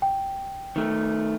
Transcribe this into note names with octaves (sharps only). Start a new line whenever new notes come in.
G5
D#3 A3